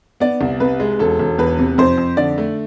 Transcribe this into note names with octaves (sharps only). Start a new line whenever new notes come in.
B3 D5
C2
C3 B4
G#3
E1 A4
E1
E2 B4
C3
F2 C5
F2
D3 D5
A3